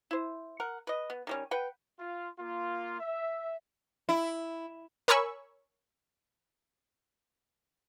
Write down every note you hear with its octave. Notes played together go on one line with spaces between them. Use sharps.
E4 C5
A#4 F#5
B4 D#5
B3
D#3 G3 C#4
B4 F#5 G5
F4
A#3 F4
E5
E4
A#4 C#5 G#5 B5 C#6 E6